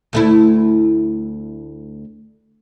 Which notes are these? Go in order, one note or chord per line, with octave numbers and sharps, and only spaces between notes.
D2 A3 E4